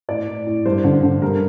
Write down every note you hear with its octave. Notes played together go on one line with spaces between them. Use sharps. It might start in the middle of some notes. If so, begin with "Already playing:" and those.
A2 D5
A2
A2
G2 C5
D3
D3
G2 A#4